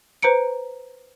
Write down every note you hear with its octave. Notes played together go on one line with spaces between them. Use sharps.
B4 C5 A#5 C#7 D7